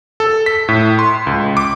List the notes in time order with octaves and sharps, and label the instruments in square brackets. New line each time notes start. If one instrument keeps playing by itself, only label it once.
[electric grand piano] A4
B6
A2
C6
C#2
D6